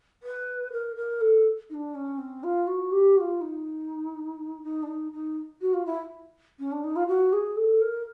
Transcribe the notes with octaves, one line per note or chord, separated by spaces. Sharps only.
B4
A#4
A#4
A4
D#4
D4
C#4
C4
F4
F#4
G4
F#4
F4
D#4
D#4
D4
D#4
D#4
F#4
F4
E4
C#4
D4
D#4
F4
F#4
G#4
A4
A#4